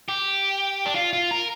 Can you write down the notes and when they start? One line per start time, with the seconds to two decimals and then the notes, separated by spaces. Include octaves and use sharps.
0.08 G4
0.86 D4
0.95 F4
1.13 F4
1.31 A#4